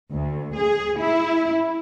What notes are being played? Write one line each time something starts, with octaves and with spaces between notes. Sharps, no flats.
D2
G#4
E4